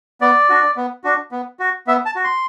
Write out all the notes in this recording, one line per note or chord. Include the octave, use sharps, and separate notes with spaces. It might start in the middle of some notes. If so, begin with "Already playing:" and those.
B3 D5
D4 F#4
B3
D4 F#4
B3
F#4
B3 E5
A5
F#4
C6